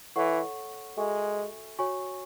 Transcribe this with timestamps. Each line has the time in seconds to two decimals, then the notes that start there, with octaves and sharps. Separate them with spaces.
0.16 E3 A4 C#5 F#5 C#6
0.97 G#3 F#4 A4 E5 G#5 C#6
1.79 F#4 C#5 G#5 C#6